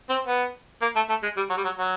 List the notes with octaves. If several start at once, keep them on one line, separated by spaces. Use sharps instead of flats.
C4
B3
A#3
A3
A3
G#3
G3
F#3
G3
F#3
F#3